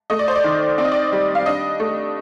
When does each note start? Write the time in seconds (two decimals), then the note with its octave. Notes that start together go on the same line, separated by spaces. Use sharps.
0.10 A3 D#5
0.19 D5
0.28 C5
0.36 D5
0.44 D#3
0.78 C4 D5
0.85 D#5
0.92 D5
1.12 G3
1.35 F5
1.46 D4 D#5
1.80 A3